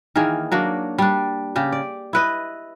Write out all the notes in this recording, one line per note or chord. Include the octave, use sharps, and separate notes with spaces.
D#3 E3 A#3 G#4
F#3 A#3 D4
G3 D4
C#3 G4
D5
E4 B4 D#5